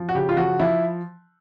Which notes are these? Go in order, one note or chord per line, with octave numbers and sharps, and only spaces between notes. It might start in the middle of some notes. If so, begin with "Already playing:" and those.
Already playing: F3
F#4
C#3 G4
F4
F3 F#4
F3 E4